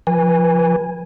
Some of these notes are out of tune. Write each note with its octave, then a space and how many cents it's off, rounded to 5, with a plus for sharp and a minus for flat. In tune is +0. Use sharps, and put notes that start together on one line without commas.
F3 +0 B4 -25 G#5 -15